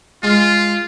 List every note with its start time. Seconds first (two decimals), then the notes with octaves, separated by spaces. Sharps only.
0.23 G#3 F4